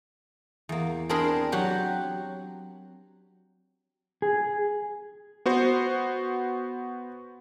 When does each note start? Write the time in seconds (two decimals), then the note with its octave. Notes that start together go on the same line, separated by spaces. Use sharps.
0.69 E2 A#3
1.09 C4 D4 G#4 A#4 B5 C6
1.52 F#3 F#4 G4
4.22 G#4
5.46 B3 F#4 C5